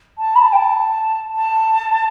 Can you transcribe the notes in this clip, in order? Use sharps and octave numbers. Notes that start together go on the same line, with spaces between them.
A5
B5
A5
G5
A5
A5